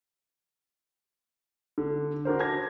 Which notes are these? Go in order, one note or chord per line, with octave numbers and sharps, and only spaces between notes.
D3
D4 F#4 A#4 C5
A5 G#6 A#6